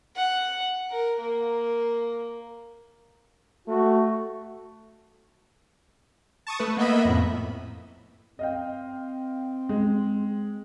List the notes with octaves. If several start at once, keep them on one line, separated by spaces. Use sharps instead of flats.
F#5
A#4
A#3
A3 F#4
A5 C#6 D#6
A3 B4
A#3 B3 D#5 E5 B5
F2 A2
C4 D#5 F5 G5
G#3